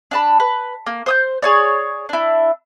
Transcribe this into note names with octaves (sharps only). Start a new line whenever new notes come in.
D4 A5 B5
B4
A#3
C5 D#6 G6
G#4 C#5 D5
D4 E4